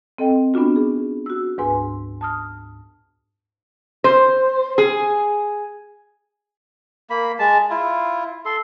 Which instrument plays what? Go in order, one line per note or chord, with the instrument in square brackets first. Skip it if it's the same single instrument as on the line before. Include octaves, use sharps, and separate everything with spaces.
[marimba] C4 A4 D#5 G5
B3 C#4 D4 F4 F#4
G#4
F#4 E6
D2 G#2 B4 G#5 C6
A5 D#6 F6
[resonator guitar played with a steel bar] C5
G#4
[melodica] A#3 B5
G#3 A5
E4 F4
A4 C6